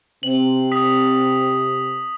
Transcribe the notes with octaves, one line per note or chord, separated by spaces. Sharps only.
C3 C4 F#7
D#6 B6